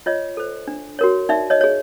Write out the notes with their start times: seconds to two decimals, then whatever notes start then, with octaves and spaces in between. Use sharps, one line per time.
0.06 F4 C#5 D#5
0.37 A4 C5
0.68 D4
0.99 F#4 A#4 C#5
1.29 D#4 D5 E5
1.50 C#5 D#5
1.61 G#4 C#5